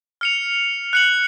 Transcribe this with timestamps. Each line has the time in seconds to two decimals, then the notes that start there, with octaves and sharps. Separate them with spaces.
0.21 F6 C#7 F7
0.93 F#6 C#7 F#7